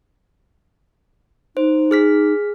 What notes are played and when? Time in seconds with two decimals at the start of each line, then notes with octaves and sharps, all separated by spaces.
1.57 D#4 C5
1.91 G#4 F6 B6